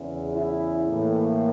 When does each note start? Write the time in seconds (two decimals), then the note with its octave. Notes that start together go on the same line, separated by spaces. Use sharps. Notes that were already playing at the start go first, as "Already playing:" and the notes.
Already playing: E2 C#3 E3
0.32 E4
0.87 A2 E3 A#3